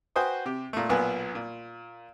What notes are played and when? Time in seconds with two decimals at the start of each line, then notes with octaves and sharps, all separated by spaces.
0.16 F#4 B4 C5 G5 G#5 D#6
0.46 C3 G4
0.73 A#2 A3
0.89 B1 A#2 B3 B4 G#5
1.35 A#2